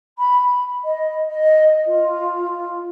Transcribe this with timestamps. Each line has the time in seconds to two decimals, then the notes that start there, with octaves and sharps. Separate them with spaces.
0.18 B5
0.84 D#5
1.29 D#5
1.86 F4